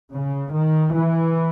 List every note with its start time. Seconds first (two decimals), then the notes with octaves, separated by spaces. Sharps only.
0.13 C#3
0.54 D#3
0.95 E3